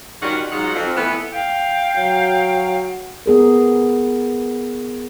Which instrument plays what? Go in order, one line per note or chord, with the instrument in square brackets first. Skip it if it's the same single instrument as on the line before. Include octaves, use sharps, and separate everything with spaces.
[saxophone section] D#3 G3 C#4 F4 F#4
G#2 F#3 D#4 F4 F#5
F2
E3 A3 B3
[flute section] F5 G5
[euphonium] F#3
[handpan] B3 G#4 A#4